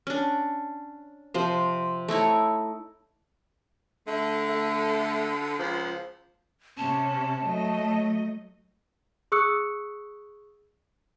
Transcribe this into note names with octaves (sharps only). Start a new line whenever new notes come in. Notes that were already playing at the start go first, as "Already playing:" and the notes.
C#4 D4
C3 F3 C5
A3 D#4 E4 C#5
D3 A3
A3
C#2 F3
C3 C#4 A5
F#3 A3 D#5
G#4 C#6 D#6 E6 F#6 C#7